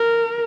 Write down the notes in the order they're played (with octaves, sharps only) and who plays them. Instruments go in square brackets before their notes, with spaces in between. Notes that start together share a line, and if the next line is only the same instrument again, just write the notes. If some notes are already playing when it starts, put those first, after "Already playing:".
Already playing: [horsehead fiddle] A#4